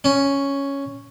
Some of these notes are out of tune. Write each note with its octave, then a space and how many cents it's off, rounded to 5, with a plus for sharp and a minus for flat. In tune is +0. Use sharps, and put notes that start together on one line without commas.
C#4 +0